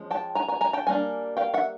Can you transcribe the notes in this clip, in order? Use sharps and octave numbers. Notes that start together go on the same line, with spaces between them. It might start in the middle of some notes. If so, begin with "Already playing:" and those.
Already playing: F3 G#3 C#4
G5 A5
G#5 A#5
G#5 A#5
G#5 A#5
G5 A5
G3 A#3 D4 G#5
F5 G5
E5 F#5